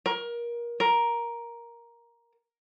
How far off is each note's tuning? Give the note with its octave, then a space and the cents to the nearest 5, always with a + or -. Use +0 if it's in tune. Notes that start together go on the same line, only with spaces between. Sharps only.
A#4 +25
A#4 +10